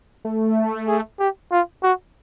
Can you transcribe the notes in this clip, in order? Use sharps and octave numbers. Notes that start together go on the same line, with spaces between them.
A3
G#4
G4
F4
F#4